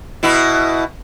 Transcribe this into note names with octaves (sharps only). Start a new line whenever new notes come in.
B2 E4